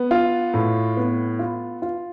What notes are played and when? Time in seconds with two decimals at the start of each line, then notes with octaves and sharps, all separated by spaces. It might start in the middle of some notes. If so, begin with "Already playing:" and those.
Already playing: B3
0.11 F4
0.54 A2
0.97 B3
1.39 F4
1.82 F4